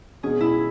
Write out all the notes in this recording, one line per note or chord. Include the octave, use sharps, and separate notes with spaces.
B2 G#3 C#4 F#4 G#4
E4